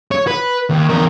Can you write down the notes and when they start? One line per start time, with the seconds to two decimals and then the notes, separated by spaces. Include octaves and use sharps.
0.11 C#5
0.27 B4
0.70 D#2
0.90 E2 A#4